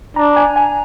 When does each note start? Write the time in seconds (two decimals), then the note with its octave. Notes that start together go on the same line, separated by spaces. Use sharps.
0.16 D4 A#5
0.37 G#5
0.56 G#5